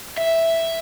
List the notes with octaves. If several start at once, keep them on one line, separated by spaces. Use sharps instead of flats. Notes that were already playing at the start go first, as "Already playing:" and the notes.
E5